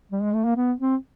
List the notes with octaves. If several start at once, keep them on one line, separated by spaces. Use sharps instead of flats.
G3
G#3
A3
A#3
B3
C4